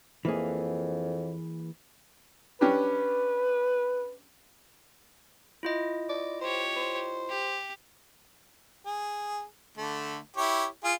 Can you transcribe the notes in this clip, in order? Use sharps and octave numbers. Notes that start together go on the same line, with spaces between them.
F2 E3 A#3 G#4
C#4 D4 G4 B4
E4 F4 D#5
D5
G4 C5 C#5
C5
G4
G#4
D3 A3
E4 G4 C#5
F4 G#4